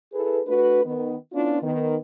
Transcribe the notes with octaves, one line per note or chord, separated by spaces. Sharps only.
E4 G#4 A4 B4
A3 D4 F#4 B4
D#3 B3
B3 C#4 D4 E4 F4
D#3 B3